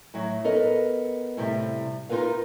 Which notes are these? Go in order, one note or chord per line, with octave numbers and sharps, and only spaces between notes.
A2 F#3
B3 A4 A#4 D#5
A2 C3 G3
D#4 F4 F#4 A#4 B4 F5